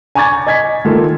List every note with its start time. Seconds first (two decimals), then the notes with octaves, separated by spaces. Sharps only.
0.15 G#5 A#5 C#6 D6 G#6 A6
0.47 D#5 G#5 G#6 B6
0.85 D#3 A#3 F4 A4